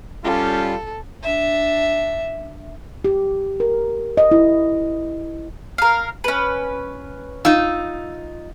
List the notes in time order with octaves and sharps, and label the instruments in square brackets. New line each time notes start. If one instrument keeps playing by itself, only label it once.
[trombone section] G3 F4 [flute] C#4 [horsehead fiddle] A4
[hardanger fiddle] D4 E5
[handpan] G4
A#4
D#5
E4
[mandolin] A#4 F5
C#4 B4
[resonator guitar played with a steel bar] D#4 F4 [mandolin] E6